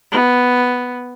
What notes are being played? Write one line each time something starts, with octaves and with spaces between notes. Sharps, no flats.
B3